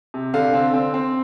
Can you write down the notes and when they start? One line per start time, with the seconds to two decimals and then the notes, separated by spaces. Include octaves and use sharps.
0.14 C3
0.34 D3 F5
0.54 C4
0.74 C4
0.94 C4